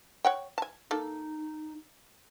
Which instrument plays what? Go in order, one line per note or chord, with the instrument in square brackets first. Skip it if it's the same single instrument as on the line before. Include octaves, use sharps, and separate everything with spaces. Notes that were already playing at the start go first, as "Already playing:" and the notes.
[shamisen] C#5 F#5 G5
G#5 A5
[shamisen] A#3 A4 [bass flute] D#4